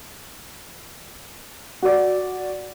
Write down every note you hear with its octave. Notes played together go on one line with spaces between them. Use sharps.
F#4 D5